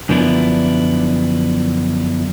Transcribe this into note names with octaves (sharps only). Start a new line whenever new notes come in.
F#2 D3 F3 B3 D4 E4